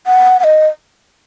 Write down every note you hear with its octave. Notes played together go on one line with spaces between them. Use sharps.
F#5
F#5
D#5